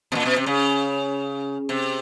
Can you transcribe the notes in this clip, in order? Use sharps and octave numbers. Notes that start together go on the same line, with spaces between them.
B2
A#2
B2
C3
C#3
C3